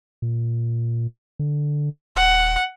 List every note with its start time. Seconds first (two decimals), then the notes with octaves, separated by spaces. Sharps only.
0.22 A#2
1.39 D3
2.16 D#1 F#5